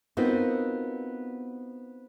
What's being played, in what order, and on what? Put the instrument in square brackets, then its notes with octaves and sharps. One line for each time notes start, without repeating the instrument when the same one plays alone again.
[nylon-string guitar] B3 C4 D#4 F4 F#4 A#4